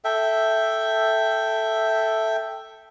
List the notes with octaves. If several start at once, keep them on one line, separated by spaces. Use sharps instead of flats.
A4 E5 G5